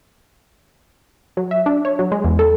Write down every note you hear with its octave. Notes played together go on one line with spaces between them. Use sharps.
F#3
E5
D4
C#5
F#3
G#3
E2
A4